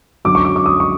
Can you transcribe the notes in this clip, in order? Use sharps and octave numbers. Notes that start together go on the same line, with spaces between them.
F#2 D3 F#3 D6
C#6
D6
D6
D#6
C#6